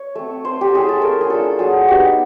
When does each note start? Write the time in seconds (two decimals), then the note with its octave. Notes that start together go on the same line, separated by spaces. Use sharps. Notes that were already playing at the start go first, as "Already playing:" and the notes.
Already playing: C#5
0.15 A3 C4
0.44 A3 C5
0.61 G4
0.73 C#4 E4 G#4
0.89 A4
1.02 A3 A#4
1.21 G#4
1.30 D4 F4 A4
1.59 F#3 G#4
1.88 B3 D#4 G4